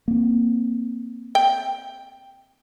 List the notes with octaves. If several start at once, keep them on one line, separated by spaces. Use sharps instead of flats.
A#3 C4
G5